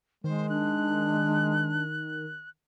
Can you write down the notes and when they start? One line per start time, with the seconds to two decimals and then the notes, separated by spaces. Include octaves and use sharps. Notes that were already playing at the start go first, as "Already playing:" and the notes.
0.24 D#3 G#3 C5
0.49 D4 F#6